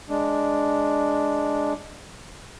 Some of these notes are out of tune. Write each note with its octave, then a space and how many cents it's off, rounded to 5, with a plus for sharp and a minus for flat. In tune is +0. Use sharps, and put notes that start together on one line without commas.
G#3 +0 D4 +0